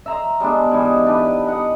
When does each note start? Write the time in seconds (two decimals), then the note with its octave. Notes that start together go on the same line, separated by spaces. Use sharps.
0.06 E5 A#5 C6
0.40 G3 G#3 B3 D4
0.71 G#2 E3 G3
1.07 D4 G4 B4
1.47 D#5 F#5